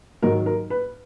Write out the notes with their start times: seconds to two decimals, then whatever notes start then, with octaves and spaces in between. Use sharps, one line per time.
0.22 G#2 D#3 F#3 A#4
0.46 A#4
0.70 B4